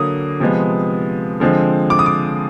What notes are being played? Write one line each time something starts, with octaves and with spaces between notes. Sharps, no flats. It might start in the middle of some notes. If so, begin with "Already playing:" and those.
Already playing: D3 F#3 A#3 D#6
C3 F3 G#3 B3
D3 F3 G#3 C4
D6
D#6
D6